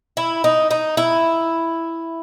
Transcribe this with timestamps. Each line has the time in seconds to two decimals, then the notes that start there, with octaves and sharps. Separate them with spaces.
0.17 E4
0.44 D#4
0.71 D#4
0.97 E4